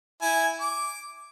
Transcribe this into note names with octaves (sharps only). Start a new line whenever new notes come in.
E4 G#5
D6